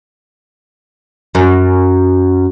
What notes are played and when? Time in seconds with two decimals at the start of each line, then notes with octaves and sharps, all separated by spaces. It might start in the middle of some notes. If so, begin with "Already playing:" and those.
1.35 F#2